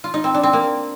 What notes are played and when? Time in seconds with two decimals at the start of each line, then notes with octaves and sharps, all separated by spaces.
0.04 F4
0.14 D#4
0.24 C4
0.34 D4
0.43 C4
0.53 A#3